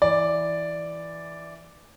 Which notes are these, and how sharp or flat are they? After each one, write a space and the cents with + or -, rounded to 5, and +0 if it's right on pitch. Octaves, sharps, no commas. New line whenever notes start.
E3 +0 D5 +0